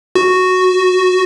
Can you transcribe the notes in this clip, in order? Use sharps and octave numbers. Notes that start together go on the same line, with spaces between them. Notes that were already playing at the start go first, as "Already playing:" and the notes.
F#4